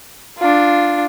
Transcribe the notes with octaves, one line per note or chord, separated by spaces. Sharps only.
D4 F4